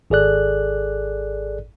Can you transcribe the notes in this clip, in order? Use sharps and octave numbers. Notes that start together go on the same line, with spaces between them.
G#1 G#4 A4 D5 F#6